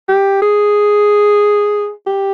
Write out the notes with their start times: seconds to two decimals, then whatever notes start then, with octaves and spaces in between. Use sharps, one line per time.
0.08 G4
0.42 G#4
2.07 G4